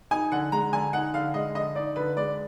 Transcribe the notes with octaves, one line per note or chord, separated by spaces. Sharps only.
D#4 G#5
D3 F#5
G#3 A#5
D3 G#5
D#4 F#5
D3 F5
G#3 D#5
D3 D#5
D#4 D5
D3 B4
G#3 D5